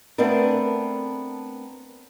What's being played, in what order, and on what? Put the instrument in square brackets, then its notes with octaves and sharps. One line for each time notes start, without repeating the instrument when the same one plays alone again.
[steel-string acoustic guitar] A3 B3 C4 D4 A#4